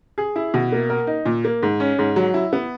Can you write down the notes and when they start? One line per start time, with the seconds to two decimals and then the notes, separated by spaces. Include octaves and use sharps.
0.18 G#4
0.36 E4
0.54 B2
0.72 A#3
0.89 A#4
1.07 D#4
1.26 A#2
1.44 A#3
1.63 G#2
1.80 C#4
1.99 G#2
2.16 F#3
2.34 E4
2.53 B3